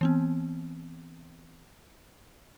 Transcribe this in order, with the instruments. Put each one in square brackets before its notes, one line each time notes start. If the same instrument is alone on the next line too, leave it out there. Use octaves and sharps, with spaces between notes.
[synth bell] E3 B3 C4